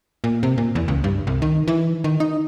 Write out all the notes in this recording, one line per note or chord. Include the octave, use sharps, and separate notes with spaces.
A#2
C3
A#2
E2
C#2
G2
C2
D#3
E3
D#3
D#4